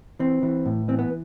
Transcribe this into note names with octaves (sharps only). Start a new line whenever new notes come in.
E3 C4
E3
A2
E3 C4
B3